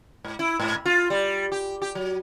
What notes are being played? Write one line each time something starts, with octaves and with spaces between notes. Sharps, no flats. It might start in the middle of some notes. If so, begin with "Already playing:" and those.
G#2
E4
G#2
F4
G3
G4
G4
F#3